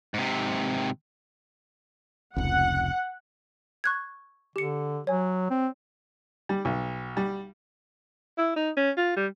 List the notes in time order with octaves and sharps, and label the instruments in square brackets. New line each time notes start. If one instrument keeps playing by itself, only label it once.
[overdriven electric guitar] G#2 C3
[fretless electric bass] F1 C#2 [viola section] F#5
[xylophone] C#6 F#6 G#6
[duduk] D3 [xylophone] G4 C#7
[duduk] F#3 [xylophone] C#5 G#5
[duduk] C4
[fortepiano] G3
B1
G3
[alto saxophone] E4
D#4
C#4
F4
G3